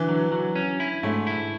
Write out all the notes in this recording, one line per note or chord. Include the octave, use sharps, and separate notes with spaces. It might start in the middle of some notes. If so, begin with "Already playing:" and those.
Already playing: D3 E3
F#3
F#3
C#4
E4
G#2 A3
E4